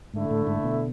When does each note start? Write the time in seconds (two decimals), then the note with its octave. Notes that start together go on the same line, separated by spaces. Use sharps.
0.14 G#2 D3 A3 E4
0.31 A2
0.47 G#2
0.64 B2